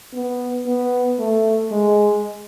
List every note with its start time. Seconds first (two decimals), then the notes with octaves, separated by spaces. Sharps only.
0.14 B3
0.67 B3
1.19 A3
1.71 G#3